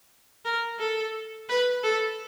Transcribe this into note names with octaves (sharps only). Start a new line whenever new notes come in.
A#4
A4
B4
A4